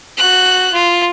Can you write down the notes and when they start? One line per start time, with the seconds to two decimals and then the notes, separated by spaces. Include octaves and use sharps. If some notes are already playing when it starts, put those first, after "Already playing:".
0.18 F#4 F#6
0.73 F4